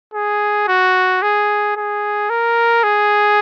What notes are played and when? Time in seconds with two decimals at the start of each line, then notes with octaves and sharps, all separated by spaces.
0.14 G#4
0.68 F#4
1.22 G#4
1.76 G#4
2.30 A#4
2.84 G#4